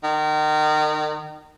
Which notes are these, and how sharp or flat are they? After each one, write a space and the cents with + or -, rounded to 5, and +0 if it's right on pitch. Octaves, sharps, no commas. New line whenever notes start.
D#3 -30